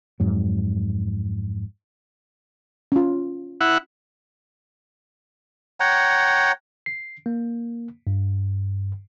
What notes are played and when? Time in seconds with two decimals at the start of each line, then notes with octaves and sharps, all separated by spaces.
0.20 F2 G#2 F#3
2.92 C#4 F4
3.61 E4 F#5
5.80 C#5 F#5 G5 A#5
6.86 C7
7.26 A#3
8.07 G2